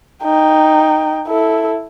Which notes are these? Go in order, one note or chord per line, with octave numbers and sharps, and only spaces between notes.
D#4 G5
E4 A4